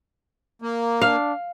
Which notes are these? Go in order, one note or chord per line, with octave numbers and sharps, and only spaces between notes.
A#3
D4 F5